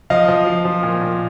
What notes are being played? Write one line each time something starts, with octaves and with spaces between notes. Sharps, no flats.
F3 D#5 F5
F3
F3
F3
A#2
A#2